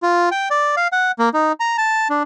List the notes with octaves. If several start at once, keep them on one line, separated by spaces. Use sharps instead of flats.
F4
G5
D5
F5
F#5
A#3
D#4
A#5
A5
D4